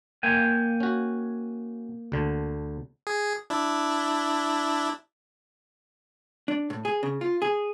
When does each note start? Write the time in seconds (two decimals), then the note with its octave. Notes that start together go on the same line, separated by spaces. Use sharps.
0.23 A#3 G5 G#5
0.80 C#4 F#4
2.12 D2 D3
3.07 G#4
3.50 D4 E4
6.48 D4
6.70 A2
6.85 G#4
7.03 C#3
7.21 F4
7.42 G#4